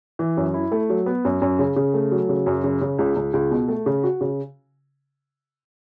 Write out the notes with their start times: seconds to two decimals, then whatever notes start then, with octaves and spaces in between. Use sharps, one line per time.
0.19 E3
0.37 F#2
0.54 E4
0.72 A3
0.90 F#3
1.06 B3
1.25 F#2
1.42 F#2
1.59 C#3
1.76 C#3
1.94 A3
2.12 F#3
2.29 C#3
2.46 F#2
2.64 C#3
2.81 C#3
2.99 C#2
3.16 C#2
3.34 C#2
3.51 B2
3.68 A3
3.86 C#3
4.03 F#4
4.21 C#3